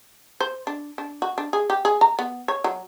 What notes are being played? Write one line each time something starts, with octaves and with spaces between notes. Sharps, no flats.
C5
D4
D4
F#4
D4
G#4
G4
G#4
A#5
B3
C#5
F#3